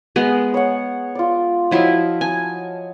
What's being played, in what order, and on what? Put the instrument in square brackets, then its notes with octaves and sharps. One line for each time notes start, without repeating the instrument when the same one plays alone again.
[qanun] G#3 B3
[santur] C#5 F#5
F4 D5
[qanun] F3 E4 F4 [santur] F#3 D#5
[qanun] G#5 [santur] A5